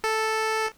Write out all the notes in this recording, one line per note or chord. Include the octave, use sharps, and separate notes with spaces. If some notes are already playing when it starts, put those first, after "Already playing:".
A4